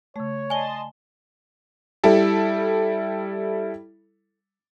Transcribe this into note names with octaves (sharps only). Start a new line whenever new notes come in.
C#3 A3 C#5
D5 D#5 G#5 A5 C6 G7
G3 E4 A4